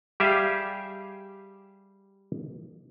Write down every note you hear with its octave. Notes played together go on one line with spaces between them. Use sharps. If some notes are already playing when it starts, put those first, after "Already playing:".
G3 G4 G#4 E5 F5